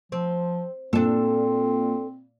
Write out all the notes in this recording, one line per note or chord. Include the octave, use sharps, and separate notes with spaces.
F3 C4
A#2 C4 D4 A4